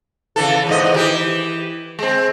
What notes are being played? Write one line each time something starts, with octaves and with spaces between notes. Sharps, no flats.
C#3 E3 A4
E2 G#2 D#5
E3 G4
G#3 C4